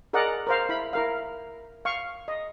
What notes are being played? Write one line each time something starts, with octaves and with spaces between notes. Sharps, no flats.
G#4 A#4 D5 D#5 F#5
A#4 C5 F5
E4 B5
E4 A#4 F5
F5 C#6
D#5